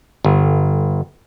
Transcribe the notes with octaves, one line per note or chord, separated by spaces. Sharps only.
G1